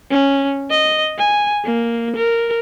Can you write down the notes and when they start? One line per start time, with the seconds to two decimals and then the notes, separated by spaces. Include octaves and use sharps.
0.11 C#4
0.70 D#5
1.18 G#5
1.64 A#3
2.16 A#4